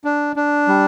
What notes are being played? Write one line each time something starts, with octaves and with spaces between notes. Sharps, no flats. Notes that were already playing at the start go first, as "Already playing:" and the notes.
D4
D4
G3